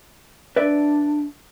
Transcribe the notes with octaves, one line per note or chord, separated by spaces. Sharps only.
D4 B4 D5 E5